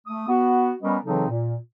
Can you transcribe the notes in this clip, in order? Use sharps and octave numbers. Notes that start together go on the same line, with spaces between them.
A3 D#6
B3 F#4
G3 B3 C#4 A#4 B4 D#5
C#3 E3 F#3 C4 D#4 A4
A#2